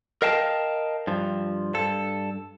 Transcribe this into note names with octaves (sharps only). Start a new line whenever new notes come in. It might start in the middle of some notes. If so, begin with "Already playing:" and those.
A#4 D#5 F5 G5 A5
G2 F3
G2 A4